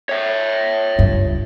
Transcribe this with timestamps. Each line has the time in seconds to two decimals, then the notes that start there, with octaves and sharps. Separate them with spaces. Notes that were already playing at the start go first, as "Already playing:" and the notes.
0.09 C#5 E5
0.99 C#2 G2